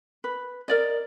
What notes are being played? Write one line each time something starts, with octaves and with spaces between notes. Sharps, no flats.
B4
A#4 D5 D#5